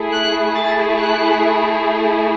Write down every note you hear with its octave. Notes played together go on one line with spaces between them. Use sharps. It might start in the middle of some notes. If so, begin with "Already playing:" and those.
Already playing: A3 E4 G#4
F#6
A6
F#6